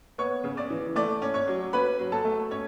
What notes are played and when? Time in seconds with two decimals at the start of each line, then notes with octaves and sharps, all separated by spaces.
0.18 B3 C#5 C#6
0.44 C#3
0.57 D5 D6
0.70 E3
0.96 A3 D5 D6
1.22 C#4
1.34 C#5 C#6
1.48 F#3
1.73 C#4 B4 B5
1.99 F#3
2.12 A4 A5
2.25 A3
2.51 C#4 C#5